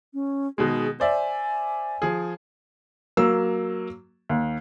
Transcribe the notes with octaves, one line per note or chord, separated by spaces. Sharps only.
C#4
B2 D#3 G#3 G#4
C5 D5 E5 G#5
F3 G#4
F#3 A#3 E6
D#2